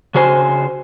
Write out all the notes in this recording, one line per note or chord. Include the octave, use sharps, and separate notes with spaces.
C#3 F#4 C5 G#5